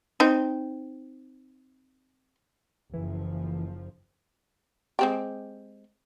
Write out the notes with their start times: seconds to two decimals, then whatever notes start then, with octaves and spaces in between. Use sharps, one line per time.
0.20 C4 D#4
2.93 F#1 E3 F3
4.99 G#3 C4 G4